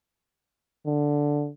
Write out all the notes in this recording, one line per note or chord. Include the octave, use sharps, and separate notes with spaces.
D3